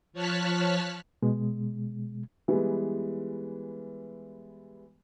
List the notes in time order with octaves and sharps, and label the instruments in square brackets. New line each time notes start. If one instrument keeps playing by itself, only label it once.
[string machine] F3 C#5 A5 F6 F#6 B6
[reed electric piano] B2 G#3
[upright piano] E3 G3 G#3 B3